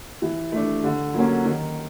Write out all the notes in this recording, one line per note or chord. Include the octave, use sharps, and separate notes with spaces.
E3
A3 D4
D3
F#3 A#3 C#4
D#3